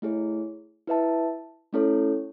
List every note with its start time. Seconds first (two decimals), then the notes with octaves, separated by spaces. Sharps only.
0.02 A3 E4 G#4 C#5
0.87 E4 B4 E5 A5
1.73 A3 C#4 E4 A4 C#5